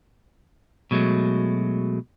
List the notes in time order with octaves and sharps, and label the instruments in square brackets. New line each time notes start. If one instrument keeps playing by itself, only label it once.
[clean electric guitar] B2 F#3 G#3 A3